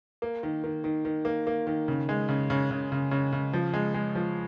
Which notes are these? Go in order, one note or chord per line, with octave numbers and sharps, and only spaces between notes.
A#3
D#3
D#3
D#3
D#3
A#3
A#3
D#3
C#3
G#3
C#3
C#3
C#3
C#3
C#3
C#3
F3
G#3
G#3
F3